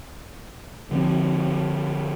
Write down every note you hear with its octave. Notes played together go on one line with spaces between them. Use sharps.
D3 F3 G3 C4